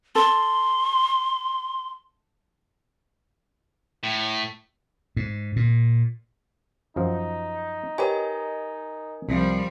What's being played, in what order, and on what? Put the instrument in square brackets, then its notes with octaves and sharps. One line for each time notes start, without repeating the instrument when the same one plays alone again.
[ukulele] A4 [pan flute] C6
[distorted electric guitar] A2
[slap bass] G#2
A#2
[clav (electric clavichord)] F#2 F3 [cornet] D#4
[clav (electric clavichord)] G4 B4 C#5 [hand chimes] A#4 D#5 G#5
[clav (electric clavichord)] C2 [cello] F3 G3